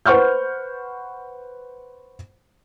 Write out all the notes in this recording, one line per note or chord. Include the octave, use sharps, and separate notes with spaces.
B4 C5 F#5 C#6 F6 G6